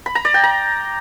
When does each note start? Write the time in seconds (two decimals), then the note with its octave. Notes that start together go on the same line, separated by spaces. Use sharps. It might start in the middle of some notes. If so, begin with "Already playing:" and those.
0.06 B5
0.15 A#5
0.25 D5
0.34 G5
0.44 A#5